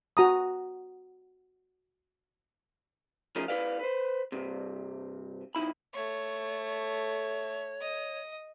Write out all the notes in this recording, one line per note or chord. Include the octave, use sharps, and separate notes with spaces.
F#4 A#5 D#6
F3 A3 C#4 D#4 G#4 A#4
E4 A4 B4 D5 F5
B4 C5
C2 G2 C3
B1 D#4 E4 B5
A3 C#5 C#6
D#5